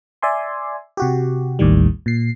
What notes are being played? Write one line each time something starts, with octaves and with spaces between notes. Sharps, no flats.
D5 E5 G#5 C6
C3 F#4 G4
A1 D#2 A2 D#3 G3
A#2 C7